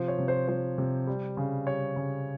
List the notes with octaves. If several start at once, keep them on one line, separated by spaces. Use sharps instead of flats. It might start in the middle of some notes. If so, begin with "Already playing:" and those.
Already playing: C3 F3 C5
C#5
C3
C5
F3 C5
C3
G3
C#3
G3 C#5
C#3